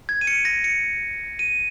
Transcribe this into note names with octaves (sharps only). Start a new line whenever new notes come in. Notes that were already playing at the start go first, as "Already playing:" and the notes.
G#6
D#7
C#7
A#6
C#7
D#7